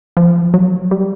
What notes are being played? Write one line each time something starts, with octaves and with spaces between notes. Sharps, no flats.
F3
F#3
G3